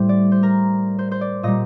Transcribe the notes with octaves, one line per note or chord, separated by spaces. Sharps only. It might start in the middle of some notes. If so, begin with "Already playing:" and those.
Already playing: A2 G3 C5
D5
C5
A#4
C5
C5
D5
A#2 G3 D#5